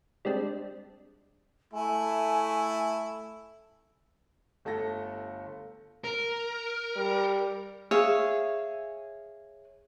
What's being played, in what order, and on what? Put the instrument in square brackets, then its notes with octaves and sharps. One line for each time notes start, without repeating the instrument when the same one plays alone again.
[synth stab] G3 G#3 C4 D4
[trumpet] A3 [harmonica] E4 [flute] G#5
[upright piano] G1 A3 A4 A#6
[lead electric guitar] A#4
[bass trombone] G3
[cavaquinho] G#4 C#5 E5 F5